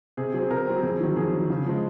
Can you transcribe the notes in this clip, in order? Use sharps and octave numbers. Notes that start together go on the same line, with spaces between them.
C3 G#4
F#3 C4 G#4
C3 A#4
F#3 C4
F2 G#4
D#3 F#3
F2 G#4
D#3 F#3
C#3
F3 G#3